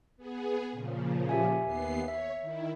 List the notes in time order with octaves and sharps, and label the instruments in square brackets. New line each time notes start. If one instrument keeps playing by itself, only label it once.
[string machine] B3 G#4
A#2 C#3 F3
[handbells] G4 E5 G#5
[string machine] D#2 B3 C7
[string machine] C#5 [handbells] E5
[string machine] D#3 E4